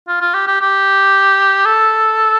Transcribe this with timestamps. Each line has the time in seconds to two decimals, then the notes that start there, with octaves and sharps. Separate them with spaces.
0.08 F4
0.21 F4
0.34 G4
0.47 G4
0.61 G4
1.65 A4